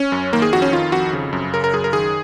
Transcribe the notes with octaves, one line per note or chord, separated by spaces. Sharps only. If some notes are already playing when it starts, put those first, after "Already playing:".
Already playing: C#4
F#2
D#3 A#3
G#4
F2 F#4
C#4
D#3 F4
F2 F#4
C#3
F#2
C#3 A#4
A#4
F#2 G#4
A#4
D#3 G#4